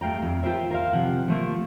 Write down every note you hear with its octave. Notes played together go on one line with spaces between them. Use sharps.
G2 A3 F5 G5 A#5
F2
F4 G4 A4 A#4 C5 E5
A#4 C5 F5
C3 F3 F#5
F3 A3 A#3